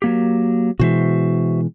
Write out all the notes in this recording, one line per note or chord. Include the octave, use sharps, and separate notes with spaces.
F#3 A#3 G4
B2 E3 G#3 F#4 C5 E5